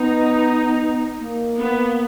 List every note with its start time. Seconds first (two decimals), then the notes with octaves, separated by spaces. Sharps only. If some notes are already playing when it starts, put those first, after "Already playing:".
Already playing: B3 D#4
1.20 A#3
1.58 B3